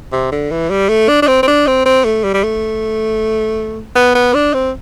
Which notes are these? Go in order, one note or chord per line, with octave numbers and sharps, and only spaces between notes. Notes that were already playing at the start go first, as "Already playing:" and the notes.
C3
D3
E3
G3
A3
D4
D4
C4
C4
D4
C4
C4
A3
G3
G3
A3
B3
B3
D4
C4